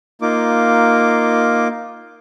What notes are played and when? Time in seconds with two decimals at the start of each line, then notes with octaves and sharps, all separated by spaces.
0.22 A#3 D#4 F4 D6